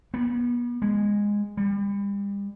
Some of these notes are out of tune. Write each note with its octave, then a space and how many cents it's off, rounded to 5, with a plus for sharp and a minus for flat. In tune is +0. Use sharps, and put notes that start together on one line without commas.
B3 -40
G#3 -15
G3 +35